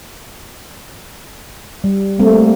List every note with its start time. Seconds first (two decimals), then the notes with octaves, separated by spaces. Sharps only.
1.84 G3
2.19 G3 A3 A#3 C4